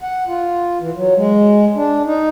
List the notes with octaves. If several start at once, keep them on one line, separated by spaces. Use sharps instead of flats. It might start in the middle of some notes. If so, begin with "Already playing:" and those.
F#5
F4
E3
F#3
G#3
D4
D#4